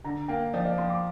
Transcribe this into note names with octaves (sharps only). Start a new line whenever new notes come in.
D3 A#5
A#3 G5
F3 D5
D5
F3 C6
D6